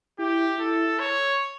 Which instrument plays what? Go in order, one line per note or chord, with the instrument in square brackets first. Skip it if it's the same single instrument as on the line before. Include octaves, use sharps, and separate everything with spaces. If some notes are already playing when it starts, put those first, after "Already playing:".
[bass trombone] E4 [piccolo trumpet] G4
[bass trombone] E4 [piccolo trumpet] A4
[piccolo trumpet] C#5